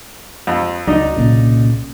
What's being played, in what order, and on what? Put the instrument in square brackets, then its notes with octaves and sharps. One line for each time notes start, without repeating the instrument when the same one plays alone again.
[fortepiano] F2
[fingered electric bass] C#2 F#3 [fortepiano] D4 D#4
[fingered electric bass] C2 A#2 C#3